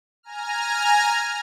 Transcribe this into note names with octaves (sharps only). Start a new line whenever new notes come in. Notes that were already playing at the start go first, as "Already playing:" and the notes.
G#5 A#5 F6